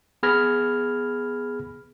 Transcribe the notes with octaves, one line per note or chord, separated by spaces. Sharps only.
B3 G#4 B5 F6 G#6 A#6